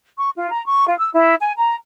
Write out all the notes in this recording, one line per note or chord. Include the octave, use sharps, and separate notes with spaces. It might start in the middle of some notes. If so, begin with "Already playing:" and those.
C#6
F4
A#5
C#6
F4
E6
E4
G#5
A#5